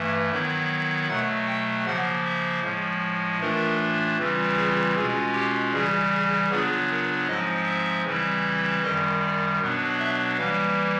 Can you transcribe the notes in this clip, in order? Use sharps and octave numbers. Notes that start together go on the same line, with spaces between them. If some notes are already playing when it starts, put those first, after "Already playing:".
Already playing: G2 E3 A3
D#3 F#3 B3 E4
B2 F#3 A3 F#5
G5
C#3 F3 A#3 F#5
E5
A2 F3 G#3
A2 E3 A3 D4 F4 A#4
C#3 E3 G3 C4 F4
G#4
B2 G#3 C#4 F4 G#4
G4
C#3 E3 G3 G#4
G#4
C#3 F#3 B3 D4 F4 G#4
A#4
G#2 F3 G#3 C4 D#5
E5
C#3 E3 G3 C4 E4
F#2 D#3 G3 D#5
D5
B2 F#3 B3 D4
E5
E3 G3 A#3 F5